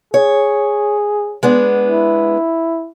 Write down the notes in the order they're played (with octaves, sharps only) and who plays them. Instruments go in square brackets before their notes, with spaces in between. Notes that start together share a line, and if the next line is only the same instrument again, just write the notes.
[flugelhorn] G#4 [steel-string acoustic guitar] C#5
[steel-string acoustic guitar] G#3 B3 D4
[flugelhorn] E4